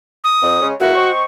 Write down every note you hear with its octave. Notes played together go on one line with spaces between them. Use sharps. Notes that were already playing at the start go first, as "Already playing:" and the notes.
D#6
F2
C#3 G#3 C#4
C#2 A#3 E4 F#4
C4 D#5 C#6